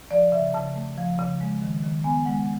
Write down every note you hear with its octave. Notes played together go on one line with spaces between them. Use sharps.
F3 D5
C#3 E5
C#3 A5
A3
F3
C#3
G#3
D#3
D#3
B3 G#5
G#3 F#5